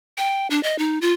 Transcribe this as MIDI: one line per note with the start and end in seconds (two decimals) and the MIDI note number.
0.17 0.47 79
0.50 0.62 62
0.63 0.78 75
0.78 0.99 63
1.02 1.13 65